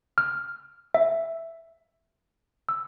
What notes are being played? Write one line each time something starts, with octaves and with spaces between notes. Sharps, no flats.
F6
E5
E6